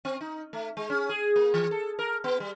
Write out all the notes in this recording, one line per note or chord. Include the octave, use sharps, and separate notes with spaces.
C4
D#4
A3
G#3
C#4
G#4
A#3
E3
A4
A#4
B3
G3